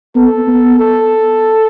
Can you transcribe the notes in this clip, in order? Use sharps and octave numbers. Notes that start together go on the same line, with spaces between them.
B3 A4
B3
A4